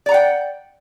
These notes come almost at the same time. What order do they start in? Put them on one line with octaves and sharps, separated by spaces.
D5 A#5 F#5 G5